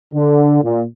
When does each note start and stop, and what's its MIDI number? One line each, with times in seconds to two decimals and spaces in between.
0.13 0.60 50
0.63 0.81 46